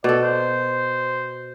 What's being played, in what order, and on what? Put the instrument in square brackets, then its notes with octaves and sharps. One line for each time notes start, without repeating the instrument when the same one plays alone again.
[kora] B2 A4 [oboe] D5
[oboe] C5